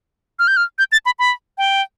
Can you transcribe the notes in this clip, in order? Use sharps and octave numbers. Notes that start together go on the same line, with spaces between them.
F6
G6
F6
G6
A6
B5
B5
G5